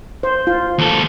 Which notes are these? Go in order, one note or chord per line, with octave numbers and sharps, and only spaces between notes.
C5
F4
D#2 A4